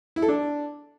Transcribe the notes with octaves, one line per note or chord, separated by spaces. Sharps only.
E4
A4
D4